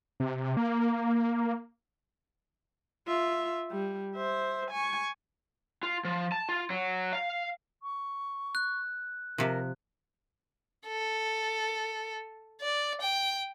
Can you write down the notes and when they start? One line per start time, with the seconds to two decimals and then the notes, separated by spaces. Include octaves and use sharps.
0.20 C3
0.57 A#3
3.07 F4 E5
3.71 G3
4.16 C5 E5
4.71 G#5 C#6
5.83 F4
6.05 F3
6.32 A5
6.49 F4
6.70 F#3
7.13 F5
7.82 C#6
8.55 F#6
9.38 C3 F3 A#4
10.87 A4
12.61 D5
13.01 G5